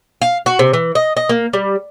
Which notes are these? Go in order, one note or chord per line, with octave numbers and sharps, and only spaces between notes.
F5
F#4
C3
E3
D#5
D#5
A#3
G3